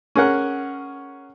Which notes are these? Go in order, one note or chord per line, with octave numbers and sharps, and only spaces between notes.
C#4 G#4 A#4 F#5